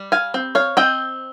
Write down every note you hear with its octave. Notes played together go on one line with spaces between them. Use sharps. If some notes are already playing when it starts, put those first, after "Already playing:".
Already playing: G3
F5 G#5
C4
C#5 F5
C4 D#5 G5